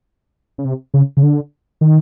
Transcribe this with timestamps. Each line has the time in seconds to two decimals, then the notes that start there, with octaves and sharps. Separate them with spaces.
0.58 C#3
0.65 C3
0.94 C#3
1.17 C#3
1.23 D3
1.81 D#3